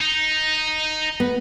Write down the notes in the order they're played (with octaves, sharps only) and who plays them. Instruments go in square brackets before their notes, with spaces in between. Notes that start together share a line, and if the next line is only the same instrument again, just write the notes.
[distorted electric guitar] D#4
[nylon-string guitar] B3